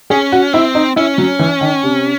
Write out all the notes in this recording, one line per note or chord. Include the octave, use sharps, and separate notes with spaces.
C#4 G#4
F#4
C4 E4
D#4
C#4 E4
F#3
E3
D#3
C3